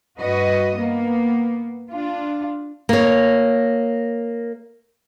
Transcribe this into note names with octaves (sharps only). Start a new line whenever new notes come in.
G2 F#4 B4 D#5
A#3 B3
D4 F4
A#3 C#5